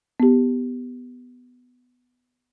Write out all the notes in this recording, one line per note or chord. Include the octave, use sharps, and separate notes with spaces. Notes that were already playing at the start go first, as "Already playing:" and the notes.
B3 G4